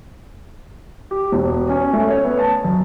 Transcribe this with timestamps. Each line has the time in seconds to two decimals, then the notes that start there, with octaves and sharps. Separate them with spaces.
1.11 G4
1.32 E1
1.69 C#4
1.93 A3
2.10 C#5
2.25 B3
2.39 A5
2.64 F#2